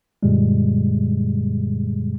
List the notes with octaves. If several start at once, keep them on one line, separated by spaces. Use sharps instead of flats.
F#2 A#2 D3 G3 G#3